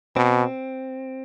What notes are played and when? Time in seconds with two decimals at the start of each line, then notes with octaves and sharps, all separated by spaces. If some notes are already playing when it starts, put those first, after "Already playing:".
0.16 B2 C4